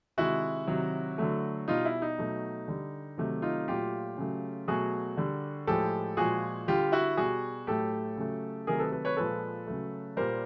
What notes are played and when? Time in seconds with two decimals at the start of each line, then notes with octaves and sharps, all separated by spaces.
0.17 C3 D#3 G#3 E4 F#4
0.67 C3 D#3 F#3
1.18 D3 F#3 A3
1.68 B2 G3 D#4 F4
1.85 E4
2.02 D#4
2.18 B2 F#3 A3
2.68 D3 G3
3.18 C3 D#3 F#3 A3
3.42 D#4 F4
3.68 A#2 F#3 A3 F4 G4
4.17 C#3 F#3 A3
4.68 B2 F#3 A3 F#4 G#4
5.17 D3 G3
5.67 A2 F3 G#3 G4 A4
6.17 A#2 F3 G#3 F#4 G#4
6.68 D3 G3 F4 G4
6.92 E4 F#4
7.17 B2 G3 F#4 G#4
7.67 A2 F#3 A3 G4 A4
8.17 C#3 F#3 A3
8.67 C3 D#3 F#3 A3 G#4 A#4
8.79 A4 B4
8.92 A4 B4
9.05 B4 C#5
9.17 A#2 F3 G#3 A4 B4
9.67 C#3 F#3 A3
10.17 A#2 G3 A#4 C5